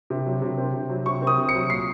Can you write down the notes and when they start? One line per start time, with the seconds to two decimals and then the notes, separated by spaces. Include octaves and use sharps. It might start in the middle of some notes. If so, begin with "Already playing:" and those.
0.10 C3
0.26 F#3
0.42 C3
0.58 C4
0.74 C3
0.90 F#3
1.06 C3 C#6
1.22 C4
1.27 D#6
1.38 C3
1.49 C#7
1.55 F#3
1.70 A#2 C7